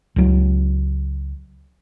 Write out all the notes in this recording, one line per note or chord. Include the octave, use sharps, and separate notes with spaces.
C#2 F#3